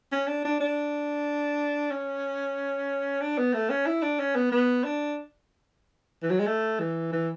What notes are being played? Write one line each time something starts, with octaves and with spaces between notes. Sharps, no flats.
C#4
D4
D4
D4
C#4
D4
B3
A3
C#4
E4
D4
C#4
B3
B3
D4
E3
F#3
G#3
A3
E3
E3